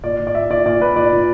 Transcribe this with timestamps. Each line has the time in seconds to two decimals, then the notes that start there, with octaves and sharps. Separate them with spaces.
0.04 A#2 D5
0.20 A#2
0.27 D5
0.35 A#2 E5
0.50 A#2 D5
0.66 A#2 D5
0.80 A#2 B4
0.96 A#2 D5
1.12 A#2